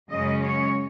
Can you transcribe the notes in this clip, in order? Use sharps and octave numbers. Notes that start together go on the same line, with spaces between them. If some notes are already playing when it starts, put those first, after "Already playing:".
F#2 C#3 G#3 C#4 D#5
C#5